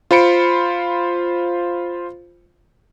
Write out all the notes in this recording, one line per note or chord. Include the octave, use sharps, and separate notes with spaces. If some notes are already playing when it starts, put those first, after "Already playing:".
F4 C5 B5 C#7 D7